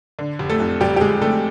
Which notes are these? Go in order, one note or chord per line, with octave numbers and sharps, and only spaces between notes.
D3
F1
A3 A4
F2
F1 G3 G4
G4
F1 G#3 G#4
F1 A3 A4